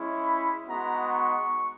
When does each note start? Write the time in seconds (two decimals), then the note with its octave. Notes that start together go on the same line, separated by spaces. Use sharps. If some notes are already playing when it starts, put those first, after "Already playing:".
Already playing: G#3 C#4 E4
0.25 B5
0.67 G#3 B3 D#4 F#4 A#5
1.10 C#6